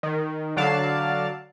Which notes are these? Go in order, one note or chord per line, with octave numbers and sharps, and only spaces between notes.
D#3
D3 F#3 D5 F5 A5